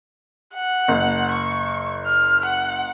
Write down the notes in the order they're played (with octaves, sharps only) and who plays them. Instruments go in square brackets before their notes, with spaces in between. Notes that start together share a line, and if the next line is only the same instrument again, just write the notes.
[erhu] F#5
[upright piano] F#1
[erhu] C#6
F6
F#5